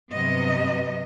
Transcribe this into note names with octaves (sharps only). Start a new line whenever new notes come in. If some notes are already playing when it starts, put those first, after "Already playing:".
G2 C3 F#3 B3 D#5